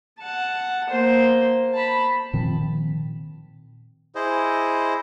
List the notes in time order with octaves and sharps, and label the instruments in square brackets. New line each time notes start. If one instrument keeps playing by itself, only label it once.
[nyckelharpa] F#5 A5
A#3 C5
A5 B5
[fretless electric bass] A#2 D#3 F3 C4
[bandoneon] E4 G#4 C5 D#5